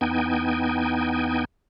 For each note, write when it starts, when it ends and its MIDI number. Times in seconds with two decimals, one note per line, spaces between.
0.01 1.45 40
0.01 1.45 59
0.01 1.45 63
0.01 1.45 79
0.01 1.45 80